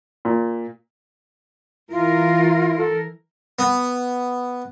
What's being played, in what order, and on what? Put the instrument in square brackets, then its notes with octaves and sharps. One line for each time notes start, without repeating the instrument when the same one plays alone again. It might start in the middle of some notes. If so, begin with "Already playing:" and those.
[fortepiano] A#2
[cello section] E3 A#4 [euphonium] E4 [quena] F4
[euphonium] A4
[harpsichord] B3